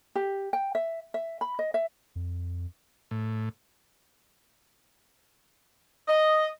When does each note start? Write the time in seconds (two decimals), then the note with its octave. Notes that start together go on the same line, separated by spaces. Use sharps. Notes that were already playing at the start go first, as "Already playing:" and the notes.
0.15 G4
0.53 G5
0.75 E5
1.14 E5
1.41 B5
1.59 D#5
1.74 E5
2.15 F2
3.11 A2
6.08 D#5